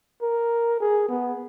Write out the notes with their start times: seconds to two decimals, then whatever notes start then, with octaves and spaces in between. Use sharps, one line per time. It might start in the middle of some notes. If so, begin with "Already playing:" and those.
0.22 A#4
0.80 G#4
1.09 B3